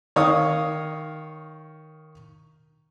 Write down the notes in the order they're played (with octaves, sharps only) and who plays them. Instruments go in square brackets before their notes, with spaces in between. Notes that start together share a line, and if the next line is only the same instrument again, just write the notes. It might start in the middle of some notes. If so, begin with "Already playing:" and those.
[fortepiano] D#3 C#5 F5 D#6